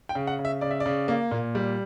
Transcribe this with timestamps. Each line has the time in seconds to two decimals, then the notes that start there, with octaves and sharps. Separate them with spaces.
0.09 G5
0.15 C#3
0.27 F#5
0.39 C#3
0.45 E5
0.61 C#3 D5
0.71 E5
0.80 D5
0.86 C#3
1.08 A#3
1.31 A#2
1.55 G3